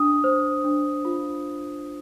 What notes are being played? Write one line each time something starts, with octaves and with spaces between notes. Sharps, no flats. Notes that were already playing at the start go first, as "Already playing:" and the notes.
Already playing: D4 D#6
C5
D4
F4